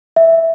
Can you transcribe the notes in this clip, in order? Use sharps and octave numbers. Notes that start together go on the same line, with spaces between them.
E5